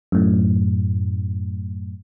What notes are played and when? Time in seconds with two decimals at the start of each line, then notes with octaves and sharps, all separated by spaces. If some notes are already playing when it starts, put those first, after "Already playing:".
0.12 F#2 A2